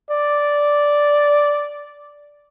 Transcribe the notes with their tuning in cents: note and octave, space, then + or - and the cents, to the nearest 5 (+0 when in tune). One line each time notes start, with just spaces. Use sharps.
D5 -5